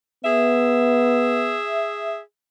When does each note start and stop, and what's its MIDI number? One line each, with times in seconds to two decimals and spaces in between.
0.25 1.59 59
0.25 2.19 68
0.25 2.19 76